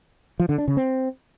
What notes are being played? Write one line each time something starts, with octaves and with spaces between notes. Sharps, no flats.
F3
D3
D4
C#3
C4